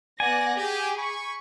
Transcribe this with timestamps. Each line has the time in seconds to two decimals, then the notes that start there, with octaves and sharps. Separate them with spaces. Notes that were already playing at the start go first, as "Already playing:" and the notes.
0.20 B3 D5 F#5 G#5 A#6
0.56 G4 G#4
0.97 G#5 B5 C#6